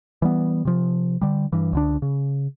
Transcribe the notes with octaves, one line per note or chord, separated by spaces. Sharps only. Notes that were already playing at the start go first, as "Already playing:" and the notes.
E3 G3 B3
C3 F3
D3 G3
G2 E3
C#2 D3 D4
C#3